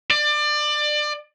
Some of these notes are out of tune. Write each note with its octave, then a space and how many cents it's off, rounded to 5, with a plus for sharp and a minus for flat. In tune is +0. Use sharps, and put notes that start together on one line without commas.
D5 +25